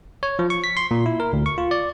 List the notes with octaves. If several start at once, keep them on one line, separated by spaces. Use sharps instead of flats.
C#5
F3
C#6
B6
C6
A#2
E4
A#4
D2
C#6
F4
D5